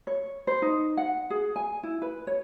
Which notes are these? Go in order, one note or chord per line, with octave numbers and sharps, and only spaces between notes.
C#5
C5
D#4
F#5
G#4
G#5
E4
B4
C#5